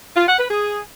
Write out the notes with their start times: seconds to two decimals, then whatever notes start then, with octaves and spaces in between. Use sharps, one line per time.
0.16 F4
0.27 F#5
0.39 B4
0.50 G#4